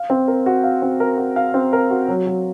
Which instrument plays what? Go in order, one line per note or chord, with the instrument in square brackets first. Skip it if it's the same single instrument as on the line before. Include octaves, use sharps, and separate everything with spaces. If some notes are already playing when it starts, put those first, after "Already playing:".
Already playing: [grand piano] F5
C4
A#4
F#4
F5
C4
A#4
F#4
F5
C4
A#4
F#4
F#3
F#3